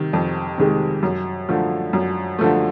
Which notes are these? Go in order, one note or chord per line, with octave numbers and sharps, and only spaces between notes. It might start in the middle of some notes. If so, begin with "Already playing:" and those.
Already playing: C3 D#3
F2
C3 D#3 G#3
F#2
D3 F3 A3
F#2
D3 F3 A3